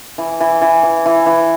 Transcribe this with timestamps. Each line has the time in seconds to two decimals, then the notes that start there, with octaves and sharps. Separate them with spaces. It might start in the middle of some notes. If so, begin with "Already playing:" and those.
0.18 E3
0.40 E3
0.62 E3
0.83 E3
1.06 E3
1.26 E3